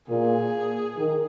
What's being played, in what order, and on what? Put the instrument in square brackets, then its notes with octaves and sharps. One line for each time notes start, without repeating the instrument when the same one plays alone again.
[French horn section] A#2 [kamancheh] G#4
[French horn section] D#3